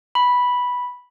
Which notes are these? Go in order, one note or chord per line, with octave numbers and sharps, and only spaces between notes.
B5